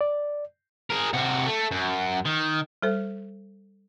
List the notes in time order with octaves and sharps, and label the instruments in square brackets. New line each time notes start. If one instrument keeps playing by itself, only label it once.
[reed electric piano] D5
[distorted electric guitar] G#4 A#4
C3 F#4
A3
F#2
D#3
[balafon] G3 A4 C5